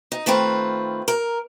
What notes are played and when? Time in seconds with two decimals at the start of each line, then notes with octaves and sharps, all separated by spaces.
0.12 D#4
0.26 D#3 A3 C4 F4 B4
1.08 A#4